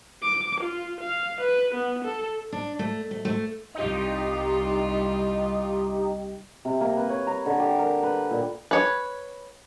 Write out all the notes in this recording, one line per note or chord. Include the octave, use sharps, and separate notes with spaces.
D6
F4
F5
B4
B3
A4
D4
A3
A3
A3
C2 D#4 F4 G4
C3
A#3
B4
C#5
A#5
D3
G4
A#4
B4
A#2
B4 C#5